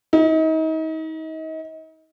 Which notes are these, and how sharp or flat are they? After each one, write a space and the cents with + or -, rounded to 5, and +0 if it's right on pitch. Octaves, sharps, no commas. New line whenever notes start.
D#4 +35